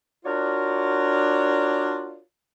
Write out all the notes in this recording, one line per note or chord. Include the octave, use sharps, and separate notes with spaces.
D4 F4 F#4 A#4 C#5 D5